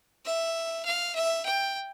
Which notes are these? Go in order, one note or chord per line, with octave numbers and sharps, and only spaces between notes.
E5
F5
E5
G5